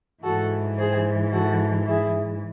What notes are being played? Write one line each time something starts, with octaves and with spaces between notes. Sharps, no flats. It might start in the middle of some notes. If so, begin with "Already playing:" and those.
G#2 E3 F#4 A4
G#4 C5
F#4 A4
E4 G#4